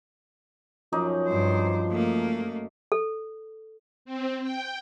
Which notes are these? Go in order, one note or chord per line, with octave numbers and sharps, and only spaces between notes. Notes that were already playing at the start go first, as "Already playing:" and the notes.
F#2 F3 D#4 D5
G2 C5
A3 A#3
A4
C4
G5